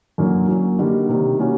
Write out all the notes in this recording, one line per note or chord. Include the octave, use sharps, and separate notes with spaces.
F#2 D3 F#3 A#3
F#3 A#3 C#4
D3 G3 A#3 D#4
C3 D#3 G3
G3 A#3 C#4 F#4